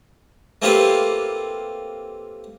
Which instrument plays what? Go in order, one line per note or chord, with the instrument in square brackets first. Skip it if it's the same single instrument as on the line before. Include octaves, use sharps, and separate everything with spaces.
[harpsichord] A3 A#3 C4 F4 G4 B4